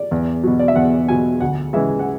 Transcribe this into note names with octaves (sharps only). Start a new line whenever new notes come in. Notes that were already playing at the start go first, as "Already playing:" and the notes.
Already playing: D5
E2
B2 F#3
D5
E5
E2 F#5
B2 F#3 G#5
D2 F#5
C#3 E3 G#3 E5
F#5